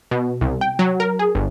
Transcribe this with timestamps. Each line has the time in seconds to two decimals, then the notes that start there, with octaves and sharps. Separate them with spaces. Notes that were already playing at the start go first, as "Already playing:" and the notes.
0.11 B2
0.41 C2
0.61 G5
0.79 F#3
1.00 A#4
1.19 G#4
1.35 G1